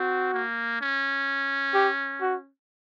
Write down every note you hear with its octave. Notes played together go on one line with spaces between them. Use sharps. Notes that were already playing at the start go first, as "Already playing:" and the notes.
Already playing: C4 F#4
A#3
C#4
G4
F#4